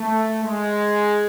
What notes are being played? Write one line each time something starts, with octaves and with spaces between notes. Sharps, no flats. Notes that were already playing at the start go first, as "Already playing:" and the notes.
Already playing: A3
G#3